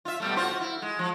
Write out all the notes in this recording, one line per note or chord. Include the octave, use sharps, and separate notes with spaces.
F4 E5
B2 G3 A3
F4 F#4 C5
E4
G#3
F3